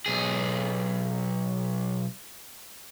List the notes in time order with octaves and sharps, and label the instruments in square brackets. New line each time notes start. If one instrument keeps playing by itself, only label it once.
[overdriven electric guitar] B1 G#4